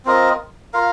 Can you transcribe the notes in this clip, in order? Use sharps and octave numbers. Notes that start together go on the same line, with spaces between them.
C4 F4 A#4 D#5
F4 A#4 F5